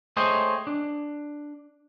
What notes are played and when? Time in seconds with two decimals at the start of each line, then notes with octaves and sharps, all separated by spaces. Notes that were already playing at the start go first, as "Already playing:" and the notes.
0.17 A3 G#4 C5 C#5 D#5 G5
0.67 D4